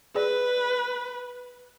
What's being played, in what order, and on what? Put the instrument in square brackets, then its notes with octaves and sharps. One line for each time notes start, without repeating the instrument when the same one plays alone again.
[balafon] G#4 D5 [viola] B4